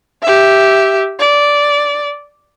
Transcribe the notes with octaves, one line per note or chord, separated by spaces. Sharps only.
G4 E5
D5